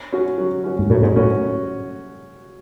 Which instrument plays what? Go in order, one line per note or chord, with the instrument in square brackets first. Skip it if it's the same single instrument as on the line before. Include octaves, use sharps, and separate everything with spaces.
[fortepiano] C#4 F#4
F#3
C#4 F#4
[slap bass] G#2
[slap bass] A2 [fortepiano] F#3
[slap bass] G#2
[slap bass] A2 [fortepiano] C#4
[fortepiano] F#4